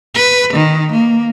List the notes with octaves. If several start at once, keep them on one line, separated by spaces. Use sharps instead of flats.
B4
D#3
A#3